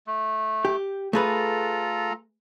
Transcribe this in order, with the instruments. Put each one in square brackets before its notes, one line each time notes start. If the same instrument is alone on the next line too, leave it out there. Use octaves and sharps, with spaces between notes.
[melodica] A3
[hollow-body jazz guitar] G4
[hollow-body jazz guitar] A3 G#4 B4 [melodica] F4 A4 A#5